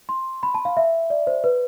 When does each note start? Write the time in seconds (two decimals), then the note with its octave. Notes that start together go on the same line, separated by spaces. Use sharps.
0.09 C6
0.43 B5
0.55 A5
0.65 F5
0.77 E5
1.10 D5
1.27 C5
1.44 B4